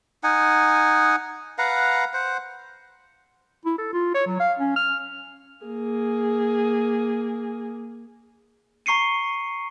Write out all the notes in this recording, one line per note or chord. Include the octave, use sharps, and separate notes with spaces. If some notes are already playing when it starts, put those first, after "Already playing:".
D#4 F#5 G#5
B4 F5 F#5 A#5
C5 F#5
E4
A4
F4
C#5
F#3
F5
C#4
F6
A#3 G#4
A#5 C#6 C7 C#7 D#7